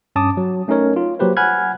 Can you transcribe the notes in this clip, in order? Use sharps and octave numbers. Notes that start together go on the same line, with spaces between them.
G2 C#4 A5 D6 D#6
F#3
A3 C#4 D#4 A#4 C#5
F4
F#3 A#3 G4 B4 C5
F#5 G#5 B5 F6 F#6 G#6